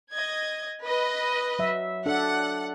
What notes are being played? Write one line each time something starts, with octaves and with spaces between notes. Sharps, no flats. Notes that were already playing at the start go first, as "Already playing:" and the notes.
D#5 G#6
B4 D#5
F#3 E5
D4 A4 F#5